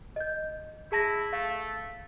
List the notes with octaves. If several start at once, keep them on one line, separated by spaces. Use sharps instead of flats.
D#5 G6
E4 G#4 A5 A#6
A3 F5